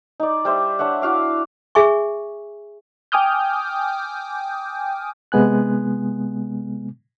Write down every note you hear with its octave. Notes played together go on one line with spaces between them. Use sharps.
D#4 D5
G3 C5 E5
D4 C#5 E5 F#5
E4 F#4 F5 D6
G#4 E5 G#5 C#6
G5 G#5 D6 D#6 F6 G6
C3 G#3 B3 G#5 F#6